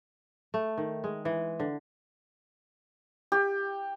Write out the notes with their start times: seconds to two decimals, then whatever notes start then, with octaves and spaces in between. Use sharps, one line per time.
0.54 A3
0.78 D#3
1.04 G#3
1.25 E3
1.60 D3
3.32 G4